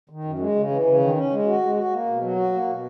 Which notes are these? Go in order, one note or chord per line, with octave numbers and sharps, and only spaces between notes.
D#3
F#2
G#3
C#3
E3
C#3
D#3
C#4
G#3
F#4
G#3
F#4
A#3
B2
F#3
F#4
A#3
B2